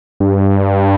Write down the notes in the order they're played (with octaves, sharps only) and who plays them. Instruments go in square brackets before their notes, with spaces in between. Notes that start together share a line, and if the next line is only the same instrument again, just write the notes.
[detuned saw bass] G2